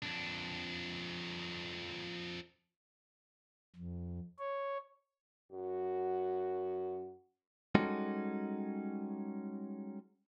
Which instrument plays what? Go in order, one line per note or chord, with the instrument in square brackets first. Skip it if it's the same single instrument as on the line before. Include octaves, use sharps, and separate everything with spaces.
[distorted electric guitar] F2 D4
[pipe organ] F2
C#5
[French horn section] F#2 F#4
[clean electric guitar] G3 G#3 C#4 D#4 F#4 A4